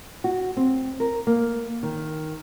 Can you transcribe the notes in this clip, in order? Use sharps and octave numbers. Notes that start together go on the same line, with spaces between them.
F#4
C4
A#4
A#3
D#3